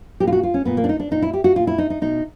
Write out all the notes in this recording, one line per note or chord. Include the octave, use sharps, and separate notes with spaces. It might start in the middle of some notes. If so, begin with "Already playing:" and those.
A#2 G4
F4
F#4
F4
C#4
A#2 B3
A#3
D4
D#4
D4
A#2 D#4
E4
G4
F#4
A#2 F4
E4
D#4
D#4
B2 D#4